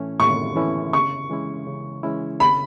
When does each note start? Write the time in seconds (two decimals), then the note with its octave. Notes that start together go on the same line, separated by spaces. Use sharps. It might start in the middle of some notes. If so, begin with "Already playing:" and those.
Already playing: A2 E3 A3 C#4 E4
0.19 A2 C#6
0.56 E3 A3 C#4 E4
0.93 C#3 C#6
1.30 E3 G#3 C#4 E4
1.67 C#3
2.03 E3 G#3 C#4 E4
2.40 C#3 B5